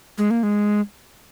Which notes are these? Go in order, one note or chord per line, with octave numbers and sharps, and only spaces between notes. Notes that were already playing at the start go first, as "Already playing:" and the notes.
G#3
A#3
G#3